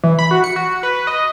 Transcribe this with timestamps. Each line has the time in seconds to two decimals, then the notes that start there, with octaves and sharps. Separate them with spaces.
0.04 E3
0.19 B5
0.31 F#4
0.44 C#7
0.56 F#4
0.83 B4
1.07 D#5